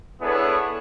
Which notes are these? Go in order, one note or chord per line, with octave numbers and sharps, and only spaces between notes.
B3 D4 E4 G#4 A4 C#5